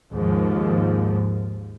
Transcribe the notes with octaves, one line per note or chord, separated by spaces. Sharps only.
D#2 G#2 F3